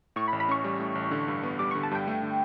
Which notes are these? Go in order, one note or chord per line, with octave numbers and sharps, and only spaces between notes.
A2 C#6
B5
A1
B5
C#4 C#6
G3
A2
A1
D3
G2
B3
G3 D6
D3 C#6
A5
G2 G5
A3
D3